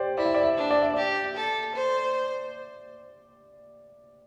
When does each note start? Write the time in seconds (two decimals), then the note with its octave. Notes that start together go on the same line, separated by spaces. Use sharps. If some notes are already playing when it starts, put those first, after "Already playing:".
Already playing: G4 C5 D5
0.17 E4 D5
0.26 E5
0.34 D5
0.44 E5
0.57 D4
0.71 D5
0.82 E5
0.94 G4 D5
1.36 A4
1.75 C5